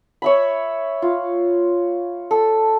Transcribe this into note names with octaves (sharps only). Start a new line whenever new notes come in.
C#5 E5 B5
F4
A4